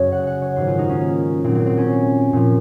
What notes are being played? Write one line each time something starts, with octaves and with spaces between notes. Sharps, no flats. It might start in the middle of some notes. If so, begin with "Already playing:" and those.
Already playing: F#2 C#3 F#3 C#5
F#5
F#5
C#5
G#2 D#3 F#3 C5
F4
D#4
C#4
A#3
A#2 F#3 C4
C4
C4
C#4
A#2 F3